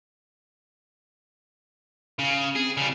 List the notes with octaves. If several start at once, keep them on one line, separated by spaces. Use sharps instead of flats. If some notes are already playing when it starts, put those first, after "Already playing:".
C#3
C4 G#4
C#3 G3